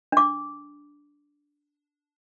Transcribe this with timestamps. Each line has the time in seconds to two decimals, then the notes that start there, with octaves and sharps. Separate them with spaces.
0.12 D4 D6